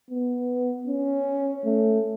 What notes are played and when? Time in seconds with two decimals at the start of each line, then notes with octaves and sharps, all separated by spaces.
0.10 B3
0.87 C#4
1.65 A3